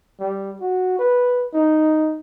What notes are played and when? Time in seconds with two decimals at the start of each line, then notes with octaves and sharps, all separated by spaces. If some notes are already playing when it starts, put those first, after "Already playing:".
0.20 G3
0.61 F#4
0.99 B4
1.53 D#4